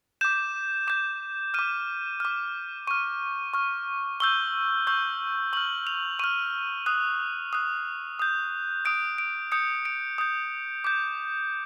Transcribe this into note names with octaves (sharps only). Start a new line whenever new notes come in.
D6 G6 E7
D6 G6 E7
D6 F6 D#7
D6 F6
C#6 F6 D#7
C#6 F6
C#6 E6 G6 G7
C#6 E6 G6
C#6 F6 F#7
F7
C#6 F6 D#7
D#6 F#6
D#6 F#6
D#6 G6
D#6 G6 D7
D7
D#6 G6 C#7
D7
D#6 G6
D6 G6